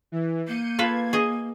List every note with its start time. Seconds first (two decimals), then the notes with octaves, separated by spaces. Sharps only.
0.12 E3
0.48 A#3 G6 C#7 D#7
0.79 F4 A4 B4 G#6
1.13 G#4 D#5